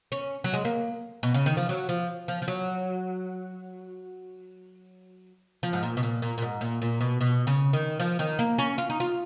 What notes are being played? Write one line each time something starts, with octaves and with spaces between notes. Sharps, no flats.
C#4
F#3
G#3
A#3
B2
C#3
D#3
F3
F#3
F3
F3
F3
F#3
F3
G#2
A#2
B2
A#2
A#2
A#2
G#2
A#2
A#2
B2
B2
C#3
D#3
F3
D#3
A#3
C#4
F4
D#4
F4